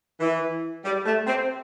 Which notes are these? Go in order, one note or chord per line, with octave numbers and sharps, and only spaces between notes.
E3
G3
A3
C4